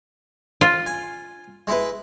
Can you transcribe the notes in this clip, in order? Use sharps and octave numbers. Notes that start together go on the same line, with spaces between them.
F4
G#5
G#3 E4 B4